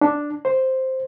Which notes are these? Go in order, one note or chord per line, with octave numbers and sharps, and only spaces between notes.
D4
C5